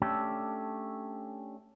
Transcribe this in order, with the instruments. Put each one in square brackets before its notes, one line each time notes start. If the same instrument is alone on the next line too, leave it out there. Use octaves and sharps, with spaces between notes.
[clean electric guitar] A3 C#4 D4 G4 A4